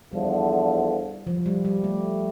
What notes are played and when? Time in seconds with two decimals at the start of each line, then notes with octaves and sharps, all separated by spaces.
0.13 E2 D3 F3 G3
1.27 F3
1.46 G3
1.65 G3
1.84 A3